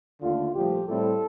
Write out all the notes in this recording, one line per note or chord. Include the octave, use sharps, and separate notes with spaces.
D#2 D3 A3 F4
C2 A#2 F3 A3 G4
A2 G3 C4 A4